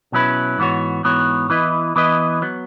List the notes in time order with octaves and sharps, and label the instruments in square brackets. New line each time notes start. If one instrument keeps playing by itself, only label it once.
[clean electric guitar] B2 F#3 C#4 E4 B4
G#2 E3 B3 F#4 C#5
G#2 E3 B3 F#4 C#5
E3 B3 E4 B4 D#5
E3 B3 E4 B4 D#5
F#3 B3